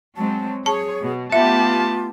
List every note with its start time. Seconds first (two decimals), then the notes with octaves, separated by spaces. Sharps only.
0.16 F#3 G#3 C4 A5
0.66 G#4 C#5 A5
1.02 B2
1.32 A3 B3 F4 G4 E5 A5